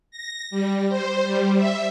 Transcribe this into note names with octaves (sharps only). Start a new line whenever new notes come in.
A#6
G3
C5
G3
E5